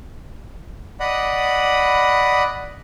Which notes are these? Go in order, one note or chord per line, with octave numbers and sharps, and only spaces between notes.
D5 D#5 F#5 B5 D#6